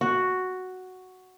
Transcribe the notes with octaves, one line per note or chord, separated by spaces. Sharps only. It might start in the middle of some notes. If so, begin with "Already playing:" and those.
F#4